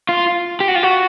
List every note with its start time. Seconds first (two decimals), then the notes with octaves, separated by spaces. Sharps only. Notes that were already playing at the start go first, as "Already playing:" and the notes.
0.09 F4
0.60 G4
0.68 F#4
0.75 F4
0.83 F#4